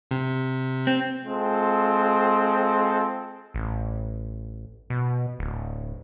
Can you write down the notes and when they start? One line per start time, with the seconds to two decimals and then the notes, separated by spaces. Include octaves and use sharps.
0.11 C3
0.87 C4
1.24 G#3 C4 F4 A4
3.54 A1
4.90 B2
5.39 D1